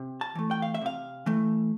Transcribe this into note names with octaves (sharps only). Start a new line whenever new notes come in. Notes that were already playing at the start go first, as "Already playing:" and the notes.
Already playing: C3
A5
E3 A3
G5
F5
E5
C3 F5
E3 A3